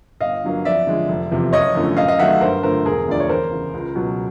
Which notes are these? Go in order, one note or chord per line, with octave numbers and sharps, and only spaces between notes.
G1 D#5 F5
G2 D3 F#3 A#3
F2 D5 E5
D3 F3 G#3
F1
E2 C3 F3
F#1 C#5 D#5
F#2 D3 F3 A3
F#2 D#5 F5
D#5 F5
D#3 F#3 A3 E5 F#5
G2 A#4 C5
D3 F3 A3 A#4 C5
E1 G#4 A#4
D2 D3 F3 D5
C#5
E2 A#4 C5
C#3 E3
C#2
B2 F#3 B3